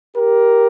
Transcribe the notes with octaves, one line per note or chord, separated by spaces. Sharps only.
G4 A#4